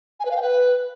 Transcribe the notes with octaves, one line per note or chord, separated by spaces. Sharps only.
G#5
B4
F5
G5
B4